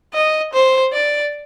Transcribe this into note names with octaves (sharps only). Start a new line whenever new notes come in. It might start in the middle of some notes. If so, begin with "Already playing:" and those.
D#5
C5
D5